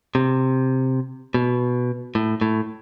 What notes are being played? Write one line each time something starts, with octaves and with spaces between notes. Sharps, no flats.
C3
B2
A2
A2